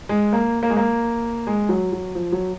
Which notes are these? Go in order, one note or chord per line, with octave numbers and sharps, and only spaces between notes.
G#3
A#3
A#3
G#3
A#3
G#3
F#3
F#3
F3
F#3